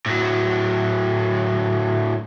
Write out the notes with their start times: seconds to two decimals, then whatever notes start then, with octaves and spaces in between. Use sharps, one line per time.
0.06 A2 F#3